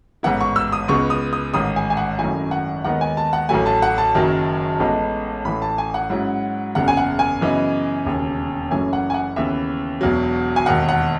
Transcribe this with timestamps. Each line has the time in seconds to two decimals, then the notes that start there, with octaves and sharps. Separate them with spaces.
0.23 A1 G#2 E3 B3 E4 F#5
0.41 C#6
0.56 E6
0.72 D#6
0.88 C#2 C#3 G#3 B3 C#6
1.10 D#6
1.33 D#6
1.54 A1 G#2 D#3 D#6
1.76 G#5
1.90 G#5
1.97 F#5
2.19 G#1 F#2 D#3 A3 E4 G#5
2.51 F#5
2.84 D#2 D#3 G#3 B3 D#4 F#5
3.01 G#5
3.17 A5
3.33 F#5
3.49 A1 A2 F#3 A3 G#5
3.66 A5
3.82 F#5
3.98 A5
4.15 F#1 F#2 D#3 F#3
4.80 A1 A2 G#3 B3 D#4
5.45 A1 A2 E3 B5
5.62 A5
5.78 G#5
5.94 F#5
6.10 G#2 F#3 C#4 E4
6.75 F#1 E2 C#3 F#5
6.88 G#5
6.97 F#5
7.19 G#5
7.41 F#2 C#3 E3 B3 D#4
8.05 E1 D#2 C#3
8.70 F#1 F#2 E3 A3 C#4 G#5
8.93 F#5
9.10 G#5
9.14 F#5
9.36 D#2 C#3 E3 B3 E5
10.01 E1 E2 B2 F#3
10.56 G#5
10.66 E1 D#2 D#3 F#5
10.89 F#5